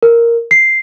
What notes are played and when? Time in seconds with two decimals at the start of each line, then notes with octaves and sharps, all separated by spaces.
0.03 A#4
0.51 C7